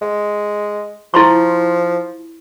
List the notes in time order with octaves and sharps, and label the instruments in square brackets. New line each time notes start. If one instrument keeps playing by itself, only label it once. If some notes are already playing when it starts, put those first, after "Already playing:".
[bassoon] G#3
[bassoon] F3 [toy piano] E4 C6 C#6